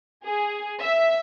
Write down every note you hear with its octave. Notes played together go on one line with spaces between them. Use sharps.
G#4
E5